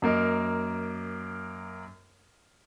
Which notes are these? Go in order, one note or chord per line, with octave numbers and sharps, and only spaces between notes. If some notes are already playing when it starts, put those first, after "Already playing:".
F#2 A#3 A#4 D#5